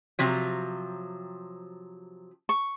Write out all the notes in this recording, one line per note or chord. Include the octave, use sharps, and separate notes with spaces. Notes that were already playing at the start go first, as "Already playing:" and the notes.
C3 F3 F#3
C#6